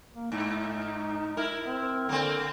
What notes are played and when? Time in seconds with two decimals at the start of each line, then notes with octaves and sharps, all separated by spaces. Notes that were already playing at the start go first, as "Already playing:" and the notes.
0.15 A#3
0.32 G#2 D#4
1.37 E4 A#4
1.66 C4
2.09 D3 A#3 C4